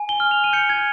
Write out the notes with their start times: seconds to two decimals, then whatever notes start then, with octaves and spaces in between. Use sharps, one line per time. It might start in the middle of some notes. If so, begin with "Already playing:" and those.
Already playing: G#5
0.09 G7
0.20 F6
0.31 F7
0.44 D#7
0.53 G6 C#7
0.70 G#6